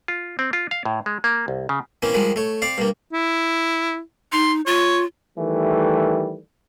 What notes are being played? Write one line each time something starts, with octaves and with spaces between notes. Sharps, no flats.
F4
C4
F4
F5
A2
G#3
A#3
C2
C#3
E3 A#3 C4 C#4
D#3 F3 G3 G#3
A3 C#5
C4 D5 F5
G2 A#3
E4
D#4 C6
F4 C#5
D#3 E3 G3 A3